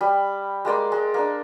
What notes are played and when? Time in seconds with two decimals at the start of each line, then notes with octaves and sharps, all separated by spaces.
0.01 G3 B5
0.65 G#3 A#3 D5 C6
0.92 G#3
1.14 A#3 D4